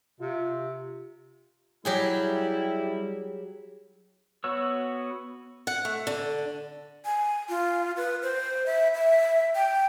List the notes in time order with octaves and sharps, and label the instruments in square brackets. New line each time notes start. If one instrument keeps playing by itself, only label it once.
[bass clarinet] C3 [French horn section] F4
[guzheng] F#3 G4 G#4 [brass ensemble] G3 E4
[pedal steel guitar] B3 F#4 C#5 E6
[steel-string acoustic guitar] F#5
A3
D3
[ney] G#5
F4
B4
C5
E5
E5
G5